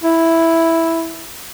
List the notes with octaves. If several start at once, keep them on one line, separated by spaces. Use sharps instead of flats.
E4